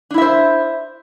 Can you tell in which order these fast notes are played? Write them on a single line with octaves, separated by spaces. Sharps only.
D4 E4 E5 C5